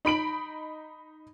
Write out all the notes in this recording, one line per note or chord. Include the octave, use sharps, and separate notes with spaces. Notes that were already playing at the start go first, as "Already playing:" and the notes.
D#4 B5 D7 F#7